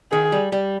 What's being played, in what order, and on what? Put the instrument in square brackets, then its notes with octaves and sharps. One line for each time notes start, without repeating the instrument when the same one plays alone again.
[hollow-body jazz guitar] D#3 [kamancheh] G#4
[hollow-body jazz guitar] G3
G3